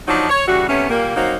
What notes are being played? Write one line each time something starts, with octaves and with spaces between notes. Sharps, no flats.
F3 F#3 D4 D#4
C#5
C#3 E3 G3 F#4
C3 A3 B3 C#4
A#2 G3 A#3
F#3 A#3 C4 D#4 F#4